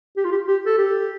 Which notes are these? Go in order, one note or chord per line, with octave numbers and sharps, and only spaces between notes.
G4
F4
G4
G4
A4
G4